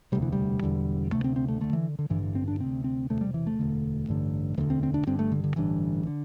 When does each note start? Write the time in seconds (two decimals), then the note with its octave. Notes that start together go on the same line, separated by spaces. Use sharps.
0.12 E1 D2 C3 G3
0.22 E3
0.32 G3
0.63 E1 E2 D3
1.12 D2 C3 A3
1.24 C4
1.36 C4
1.48 A3
1.61 D2 D3 A3
1.73 E3
1.99 D3
2.10 A1 G2 D3 E3
2.23 E3
2.35 C4
2.48 D4
2.60 D2 C3 C4
2.84 C4
3.10 E1 D2 C3 A3
3.21 G3
3.34 E3
3.47 A3
3.59 E1 D2 D3
4.09 A1 G2 D3
4.57 E1 D2 D3 E3
4.70 C4
4.83 C4
4.94 D4
5.07 G1 G2 D3 C4
5.19 A3
5.32 D3
5.44 D3
5.56 A1 G2 D3 E3
6.07 D3